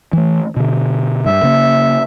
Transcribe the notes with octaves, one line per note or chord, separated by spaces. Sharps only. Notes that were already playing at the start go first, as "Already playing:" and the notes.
E3 A3
B2 D3
G2 E5
C#3 A#3